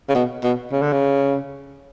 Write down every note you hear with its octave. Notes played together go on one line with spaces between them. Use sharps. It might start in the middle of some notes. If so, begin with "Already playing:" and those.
C#3
B2
B2
C#3
D3
C#3